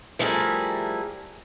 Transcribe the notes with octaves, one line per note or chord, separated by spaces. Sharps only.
F3 G3 A3 E4 G#4 A#4